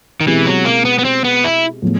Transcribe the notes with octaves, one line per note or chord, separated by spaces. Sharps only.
D#3
B2 E3 G#3 C4 E4 G4
F#3
A#3
B3
B3
C4
B3
E4
A2 F3 G#3 B3